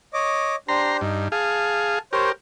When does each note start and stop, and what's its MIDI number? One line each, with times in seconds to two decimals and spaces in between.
0.14 0.56 73
0.14 0.56 75
0.14 0.56 86
0.68 1.01 62
0.68 1.01 67
0.68 1.01 72
0.68 0.97 82
0.68 0.97 84
1.01 1.28 43
1.01 1.27 63
1.32 1.99 68
1.32 1.99 77
1.32 1.99 81
2.13 2.32 67
2.13 2.32 70
2.13 2.29 72
2.13 2.29 73